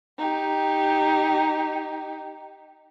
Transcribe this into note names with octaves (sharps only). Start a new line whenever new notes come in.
D#4 G4